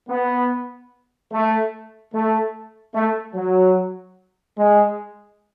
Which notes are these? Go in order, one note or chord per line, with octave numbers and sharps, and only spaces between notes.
B3
A3
A3
A3
F#3
G#3